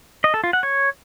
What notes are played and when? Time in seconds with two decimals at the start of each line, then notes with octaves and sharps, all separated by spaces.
0.24 D#5
0.34 A4
0.44 F4
0.53 F#5
0.63 C#5